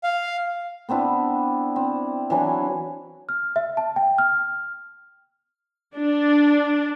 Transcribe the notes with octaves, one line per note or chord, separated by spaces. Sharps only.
F5
B3 C4 D4 E4
C4
E3 F#3 D4 G#5
F6
E5
A5
G5
F6
D4